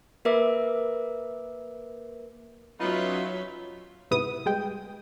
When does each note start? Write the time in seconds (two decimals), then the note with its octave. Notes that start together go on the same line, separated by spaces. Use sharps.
0.25 A#3 A#4 B4 E5 D6
2.80 F#3 B3 C#4 D#4 F4 E5
4.11 G#2 C3 B3 E4 D#6
4.46 G3 G#3 G5